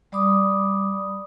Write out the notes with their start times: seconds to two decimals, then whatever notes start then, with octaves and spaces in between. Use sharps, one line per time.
0.12 G3 D5 B5 D6 D#6